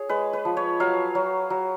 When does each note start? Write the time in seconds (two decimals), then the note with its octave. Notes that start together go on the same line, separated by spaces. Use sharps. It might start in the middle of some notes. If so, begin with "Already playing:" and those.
Already playing: G#4 C#5
0.09 G#3 B4
0.33 B4
0.45 F3
0.57 C#5
0.80 F#3 F5
1.15 F#3
1.50 F#3